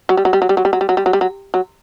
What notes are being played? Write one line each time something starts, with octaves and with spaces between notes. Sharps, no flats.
F#3
G3
F#3
G3
F#3
G3
F#3
G3
F#3
G3
F#3
G3
F#3
G3
F#3
F#3